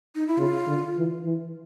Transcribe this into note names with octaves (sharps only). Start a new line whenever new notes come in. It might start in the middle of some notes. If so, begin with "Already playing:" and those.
D#4
E4
C#3 F4
D3
E3
E3